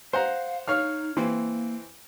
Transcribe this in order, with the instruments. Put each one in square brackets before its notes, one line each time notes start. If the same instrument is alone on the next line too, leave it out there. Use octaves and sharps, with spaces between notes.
[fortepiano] C5 F#5 A#5 [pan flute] F5
[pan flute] D#4 [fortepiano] C#5 F5 F6
[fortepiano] E3 C4 [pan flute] A#3